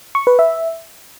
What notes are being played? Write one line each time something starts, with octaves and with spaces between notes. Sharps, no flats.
C#6
B4
E5